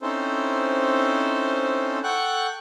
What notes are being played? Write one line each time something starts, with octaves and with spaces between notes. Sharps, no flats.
C4 C#4 D#4 E4 A4 C5
A4 F#5 G5 C#6 F#6